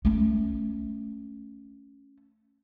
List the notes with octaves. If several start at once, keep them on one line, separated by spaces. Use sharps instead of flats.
A3 C#4